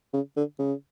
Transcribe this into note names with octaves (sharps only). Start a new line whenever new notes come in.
C#3
D3
C#3